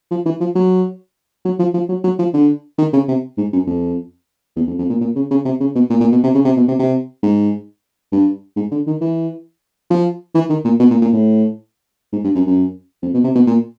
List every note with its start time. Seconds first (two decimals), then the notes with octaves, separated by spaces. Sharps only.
0.11 F3
0.26 E3
0.40 F3
0.55 F#3
1.45 F#3
1.59 F3
1.74 F3
1.89 F#3
2.04 F#3
2.19 F3
2.34 D3
2.78 D#3
2.93 C#3
3.09 C3
3.38 G#2
3.53 F#2
3.67 F2
4.56 E2
4.68 F2
4.78 F2
4.90 A#2
5.01 A#2
5.16 C#3
5.31 C#3
5.45 C3
5.60 C#3
5.75 B2
5.90 A#2
6.00 A#2
6.12 B2
6.23 C3
6.35 C#3
6.45 C3
6.57 B2
6.68 C3
6.79 C3
7.23 G#2
8.12 G2
8.57 G#2
8.71 D3
8.87 D#3
9.01 E3
9.90 F3
10.35 E3
10.49 D#3
10.65 A#2
10.80 B2
10.91 A#2
11.02 A#2
11.13 A2
12.13 G#2
12.24 G2
12.35 F#2
12.47 F#2
13.03 F2
13.14 B2
13.24 C3
13.36 B2
13.47 A#2